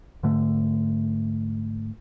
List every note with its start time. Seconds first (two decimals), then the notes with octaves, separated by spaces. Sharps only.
0.23 G#2 D3 A3